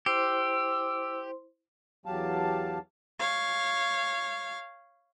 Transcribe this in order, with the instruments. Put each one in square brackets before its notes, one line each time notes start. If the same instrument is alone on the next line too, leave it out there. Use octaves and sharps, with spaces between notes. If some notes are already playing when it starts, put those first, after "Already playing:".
[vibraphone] E4 C5 C6 [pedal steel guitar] G4 [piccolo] E6
[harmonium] E2 F#3 G4 F5 A5
[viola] C#5 F5